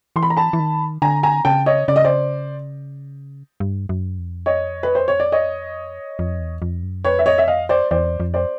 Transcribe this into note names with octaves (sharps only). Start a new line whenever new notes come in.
E3 C6
B5
A#5
A5 B5
E3
D#3
D3 G#5 A#5
G#5 A#5
C#3 G5 A5
C#5 D#5
C#3 D5
D#5
C5 D5
G2
F#2
F2
C#5 D#5
B4
C5
C#5
D5
C#5 D#5
F2
E2
F2
F#2
F2 B4 C#5
E5
C#5 D#5
E5
D#5 F5
C5 D5
E2 C5 D5
F2
C5 D5